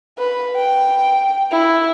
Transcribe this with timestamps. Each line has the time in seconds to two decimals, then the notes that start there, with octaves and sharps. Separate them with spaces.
0.18 B4
0.56 G5
1.51 E4